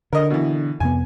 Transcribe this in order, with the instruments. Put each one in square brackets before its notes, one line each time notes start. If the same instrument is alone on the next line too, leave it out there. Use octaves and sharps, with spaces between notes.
[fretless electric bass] D3 [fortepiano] A#4 D#5
[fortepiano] B2 E3
[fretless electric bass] F2 C3 B3 [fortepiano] G#5